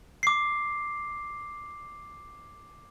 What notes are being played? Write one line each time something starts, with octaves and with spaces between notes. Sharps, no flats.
D6 C7